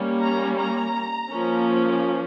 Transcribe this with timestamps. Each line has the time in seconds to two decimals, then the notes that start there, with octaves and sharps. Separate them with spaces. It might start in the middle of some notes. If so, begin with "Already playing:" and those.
Already playing: G3 A#3 C#4
0.21 A#5
0.58 A#5
1.29 F3 A#3 C#4